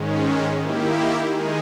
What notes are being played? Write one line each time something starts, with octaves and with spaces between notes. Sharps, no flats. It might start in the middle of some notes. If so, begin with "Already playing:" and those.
Already playing: G#2 D#3 G#3 C#4
D#3 A#3 E4 G4
D#3 G#3 D#4 G#4